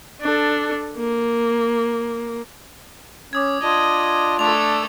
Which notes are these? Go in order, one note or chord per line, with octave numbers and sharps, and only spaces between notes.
D4 A4
A#3
C#4 D6 D#6 G#6
D4 F4 D#5
D6
A3 D4 A4 D6 F7